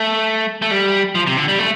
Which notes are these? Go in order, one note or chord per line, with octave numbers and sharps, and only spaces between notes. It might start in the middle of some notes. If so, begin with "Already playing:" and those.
Already playing: A3
A3
G3
F3
C3
D3
G3
A3